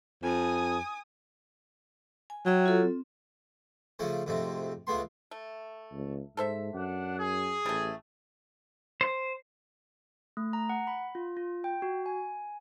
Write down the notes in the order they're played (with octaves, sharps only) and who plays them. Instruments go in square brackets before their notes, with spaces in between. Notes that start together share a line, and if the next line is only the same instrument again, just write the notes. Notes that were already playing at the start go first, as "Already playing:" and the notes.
[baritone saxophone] F2 [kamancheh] G#5 D#6
[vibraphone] G#5
[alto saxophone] F#3 [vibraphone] E5 G5
[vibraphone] F4 A4
C4
[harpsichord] C#3 F3 A3 C#4
F2 G#2 C3 A3
C#2 C#3 A3 B3 C6
[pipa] A3
[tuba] C#2
[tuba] G#2 [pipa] A4 C5 E5
[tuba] F#2 [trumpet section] D4 F#5
[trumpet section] G#4
[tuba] A1 [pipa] G3 A3
[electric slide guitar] C5
[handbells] A3
A#5
F#5
B5
F4
F4
G5
F#4
G#5